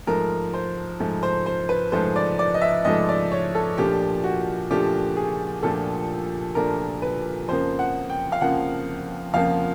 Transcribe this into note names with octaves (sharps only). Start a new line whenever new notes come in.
G#2 F3 A3 A#4
C5
G#2 F3 A3
C5
C5
B4
G#2 F3 A3 C5
D5
D5
D#5
E5
G#2 F3 A3 D#5
D5
C#5
A4
A#2 F3 A3 D4 G4
F#4
A#2 F3 A3 D4 G4
G#4
A#2 F3 A3 D4 A4
A#2 F3 A3 D4 A#4
B4
F2 C#3 F3 A#3 C5
F#5
G5
F5
F2 C#3 F3 A#3 F#5
F2 C#3 F3 A#3 F5